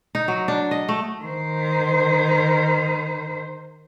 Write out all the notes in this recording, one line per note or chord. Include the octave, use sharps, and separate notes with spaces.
D#4
F#3
D4
D#5
A3
D#3 C5